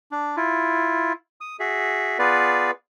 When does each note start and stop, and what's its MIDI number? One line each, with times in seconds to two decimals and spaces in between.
0.12 0.36 62
0.37 1.13 64
0.37 1.13 65
1.41 1.57 87
1.60 2.18 66
1.60 2.18 68
1.60 2.18 76
2.19 2.71 59
2.19 2.71 65
2.19 2.71 68
2.19 2.71 71
2.19 2.71 74